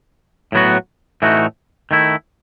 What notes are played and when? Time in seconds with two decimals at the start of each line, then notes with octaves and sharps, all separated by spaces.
0.52 A2 F#3 B3 F#4
1.22 A2 E3 A3 D#4 F#4
1.91 D#3 A3 E4